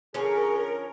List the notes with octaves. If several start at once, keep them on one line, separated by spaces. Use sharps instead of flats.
D3 F3 C#4 G#4 A#4